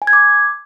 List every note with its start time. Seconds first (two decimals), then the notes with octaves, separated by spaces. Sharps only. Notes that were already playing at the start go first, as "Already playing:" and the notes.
0.02 G#5
0.07 G#6
0.13 D6